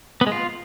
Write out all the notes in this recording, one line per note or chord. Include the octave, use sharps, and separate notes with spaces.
B3
G#3
F4